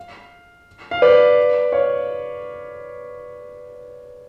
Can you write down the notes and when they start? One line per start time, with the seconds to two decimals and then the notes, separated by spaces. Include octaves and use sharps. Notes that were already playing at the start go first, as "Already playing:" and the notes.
Already playing: F5
0.91 F5
1.02 B4 D5
1.72 C#5 F5